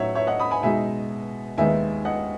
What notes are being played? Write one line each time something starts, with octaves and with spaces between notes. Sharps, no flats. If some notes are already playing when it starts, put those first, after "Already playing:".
Already playing: A2 F#3 A3 D#4 C#5 E5 F#5
C#5 E5
D#5 F#5
B5 D#6
G#5 B5
B2 G#3 D#4 E5 G#5
D#2 D#3 G#3 B3 D#4 E5 G#5
D#5 F#5